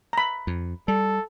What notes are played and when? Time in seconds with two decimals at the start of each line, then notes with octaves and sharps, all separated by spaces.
0.13 A#5 B5
0.47 F2
0.88 G3 A4